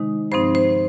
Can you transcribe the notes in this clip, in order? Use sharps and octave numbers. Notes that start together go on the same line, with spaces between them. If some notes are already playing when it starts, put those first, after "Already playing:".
Already playing: C3 D#3 G#3 D#4
G2 F3 C4 D#4 C5
C5